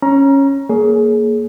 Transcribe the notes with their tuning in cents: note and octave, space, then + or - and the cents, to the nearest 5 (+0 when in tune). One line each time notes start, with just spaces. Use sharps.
C#4 -10 A#5 +20
A#3 +0 G#4 +25 C#5 +15